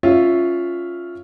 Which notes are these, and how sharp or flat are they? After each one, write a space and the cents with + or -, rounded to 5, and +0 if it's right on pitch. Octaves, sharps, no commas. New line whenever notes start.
C#4 +0 F4 +0 E5 +0